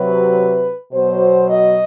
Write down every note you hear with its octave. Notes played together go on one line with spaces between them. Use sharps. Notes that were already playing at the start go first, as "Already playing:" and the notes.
Already playing: C3 F#3 B4
B2 F#3 C5
D#5